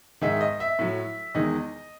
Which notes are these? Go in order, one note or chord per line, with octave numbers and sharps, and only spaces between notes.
G#2 D#3 G#3 E5
D#5
E5
A2 F#3
E2 D#3 G#3 D#5